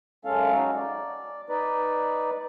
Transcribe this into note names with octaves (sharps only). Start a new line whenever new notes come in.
F#2 G#3 C#4 A4 F5
C#4 D#4 F#4
D5
D#4 B4 D5